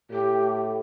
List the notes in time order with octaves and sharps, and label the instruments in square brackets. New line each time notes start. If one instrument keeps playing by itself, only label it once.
[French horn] A2 [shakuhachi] G4